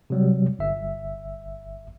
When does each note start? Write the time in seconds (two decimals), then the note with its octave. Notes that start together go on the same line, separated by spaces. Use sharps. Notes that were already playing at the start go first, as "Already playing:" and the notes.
0.10 C3 F#3 G3
0.59 G1 E5